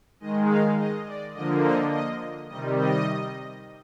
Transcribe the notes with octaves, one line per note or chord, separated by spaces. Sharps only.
D#3 G#3 D#5
F5
D#5
D5
D3 F3 A#3 D#5
D#5
D#5
C3 D#3 G3 D#5
D#5